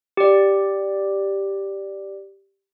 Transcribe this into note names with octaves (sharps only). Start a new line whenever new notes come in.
G4 D5